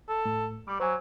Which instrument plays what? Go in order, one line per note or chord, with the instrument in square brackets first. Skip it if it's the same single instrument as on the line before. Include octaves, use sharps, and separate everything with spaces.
[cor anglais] A4
[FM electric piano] A2
[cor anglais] G3 [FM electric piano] D6
[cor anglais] F#3 [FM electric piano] C5 G#5